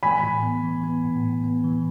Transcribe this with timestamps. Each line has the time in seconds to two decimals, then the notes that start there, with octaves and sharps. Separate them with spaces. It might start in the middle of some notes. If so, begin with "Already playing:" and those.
0.03 E3 G#5 B5
0.23 A2
0.43 B3
0.64 E3
0.84 B3
1.04 A2
1.24 A2
1.44 B3
1.64 E3